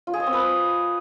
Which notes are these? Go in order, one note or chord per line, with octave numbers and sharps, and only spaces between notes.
F4
G#4
D#5
C4
B4